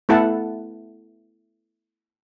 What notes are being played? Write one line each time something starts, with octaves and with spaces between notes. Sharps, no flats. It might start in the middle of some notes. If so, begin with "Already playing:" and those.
A3 B3 E4 A4 F#5 A5